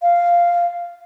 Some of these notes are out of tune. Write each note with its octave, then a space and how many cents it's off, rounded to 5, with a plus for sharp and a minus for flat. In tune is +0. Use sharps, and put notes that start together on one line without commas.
F5 -5